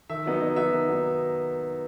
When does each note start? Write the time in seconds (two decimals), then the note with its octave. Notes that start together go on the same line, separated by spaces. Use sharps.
0.10 D#3 E5
0.26 F#3 B3 D#4
0.41 D#3 D#5
0.56 F#3 B3 D#4 E5
0.72 D#3
0.87 F#3 B3 D#4